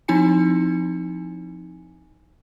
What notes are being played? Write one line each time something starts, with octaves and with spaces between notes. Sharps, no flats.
F3 C4 D#4 E4 G#5 C#7